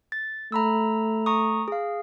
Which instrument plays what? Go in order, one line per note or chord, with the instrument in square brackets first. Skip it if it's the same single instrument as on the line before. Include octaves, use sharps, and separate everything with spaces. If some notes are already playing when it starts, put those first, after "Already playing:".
[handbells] A6
[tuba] A3 [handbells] A#5 B5 E6
[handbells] A#5 C#6 D#6
G#4 F5